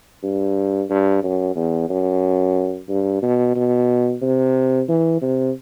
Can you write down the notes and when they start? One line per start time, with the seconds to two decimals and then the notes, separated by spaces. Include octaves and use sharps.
0.23 G2
0.90 G2
1.23 F#2
1.56 E2
1.89 F#2
2.89 G2
3.22 B2
3.56 B2
4.22 C3
4.89 E3
5.21 C3